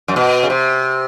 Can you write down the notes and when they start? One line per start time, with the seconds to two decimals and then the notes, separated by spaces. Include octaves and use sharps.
0.08 F#2
0.16 B2
0.43 C#3
0.50 C3